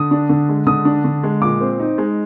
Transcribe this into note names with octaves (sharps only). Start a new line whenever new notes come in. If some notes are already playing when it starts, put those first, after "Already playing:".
Already playing: D3 D#6
D4
D3
G#3
D3 D#6
D4
D3
G#3
A#2 D6
C4
D#4
G#3